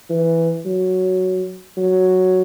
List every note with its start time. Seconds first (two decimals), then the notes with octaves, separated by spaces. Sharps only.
0.09 E3
0.65 F#3
1.77 F#3